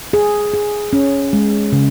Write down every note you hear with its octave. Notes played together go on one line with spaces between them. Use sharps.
G#4
G#4
C#4
G#3
C#3